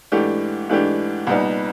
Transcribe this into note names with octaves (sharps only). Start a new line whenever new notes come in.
G#2 E3 A3 D4 G4
G#2 E3 A3 D4 G4
C2 A#2 G3 B3 D#4